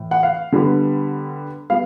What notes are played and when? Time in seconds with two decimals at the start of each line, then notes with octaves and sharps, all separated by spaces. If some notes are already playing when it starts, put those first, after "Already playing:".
Already playing: A2 E3
0.11 F#5
0.23 F5
0.52 D3 G3 B3
1.70 G3 B3 F5